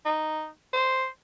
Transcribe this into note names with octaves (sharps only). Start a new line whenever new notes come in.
D#4
C5